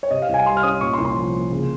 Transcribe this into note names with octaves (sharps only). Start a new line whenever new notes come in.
C#5
C3 D#5
F5
C2 G#5
G3 C6
F6
C#4 D#6
A#2 C#6
C6
C2
C6
F3
A#3
C#3